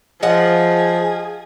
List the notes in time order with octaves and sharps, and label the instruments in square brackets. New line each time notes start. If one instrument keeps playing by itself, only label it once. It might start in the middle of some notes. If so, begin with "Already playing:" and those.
[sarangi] F3 [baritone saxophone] G#4 [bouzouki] D#5 F#5